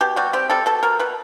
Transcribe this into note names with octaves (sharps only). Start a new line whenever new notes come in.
B2 G4
G3 F#4
C4 G4
G3 A4
B2 A4
B2 A#4
B2 B4